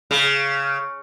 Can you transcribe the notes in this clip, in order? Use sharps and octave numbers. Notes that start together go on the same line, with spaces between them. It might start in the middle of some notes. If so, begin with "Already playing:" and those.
C#3